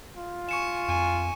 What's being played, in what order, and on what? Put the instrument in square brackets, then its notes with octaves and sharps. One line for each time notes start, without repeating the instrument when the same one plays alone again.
[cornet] F4
[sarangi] G#5 [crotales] C#6 C#7 E7
[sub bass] F2 [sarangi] G#5